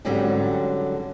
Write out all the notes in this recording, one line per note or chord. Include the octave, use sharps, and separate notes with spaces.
G#2 D3 F#3 G3 C4 C#4